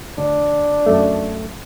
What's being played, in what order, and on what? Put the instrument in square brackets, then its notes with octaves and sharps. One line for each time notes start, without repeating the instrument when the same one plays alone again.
[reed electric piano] D2 [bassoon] D4
[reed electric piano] F#2 A3